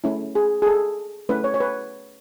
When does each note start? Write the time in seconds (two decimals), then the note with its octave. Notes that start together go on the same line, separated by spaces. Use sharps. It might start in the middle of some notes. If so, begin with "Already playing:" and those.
0.04 A3 C#4 E4
0.35 G#4
0.62 G#4
0.67 A4
1.29 A3 C#4 E4 B4
1.44 C#5
1.54 C#5
1.60 B4